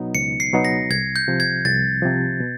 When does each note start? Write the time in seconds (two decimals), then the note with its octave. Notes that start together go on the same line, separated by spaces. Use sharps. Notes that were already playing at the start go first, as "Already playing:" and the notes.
Already playing: B2 F#3 B3 D#4
0.15 C#2 C#7
0.40 C7
0.53 B2 F#3 B3 D#4
0.65 A#6
0.90 C2 G#6
1.16 G6
1.28 C3 F3
1.40 G#6
1.65 C2 A6
2.02 C3 F3
2.40 B2